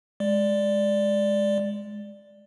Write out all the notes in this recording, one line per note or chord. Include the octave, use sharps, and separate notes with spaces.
G#3 D5